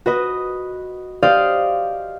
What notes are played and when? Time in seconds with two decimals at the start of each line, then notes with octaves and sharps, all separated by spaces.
0.06 F#4 B4 D#5
1.23 G4 C5 D5 D#5 F5